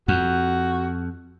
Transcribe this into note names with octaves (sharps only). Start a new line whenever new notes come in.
F2 F#4